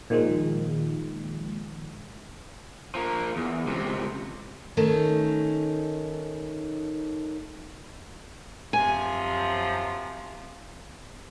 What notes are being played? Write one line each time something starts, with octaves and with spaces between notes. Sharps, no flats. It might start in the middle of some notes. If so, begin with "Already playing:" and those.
A#2 D#3 F3 G#3
F3 A#3
E2
C#2 C3
D#3 A3 C#4 D#4
F#2 C3 F3 G#5